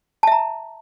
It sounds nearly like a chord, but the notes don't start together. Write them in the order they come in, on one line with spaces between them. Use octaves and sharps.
A5 E5 A#5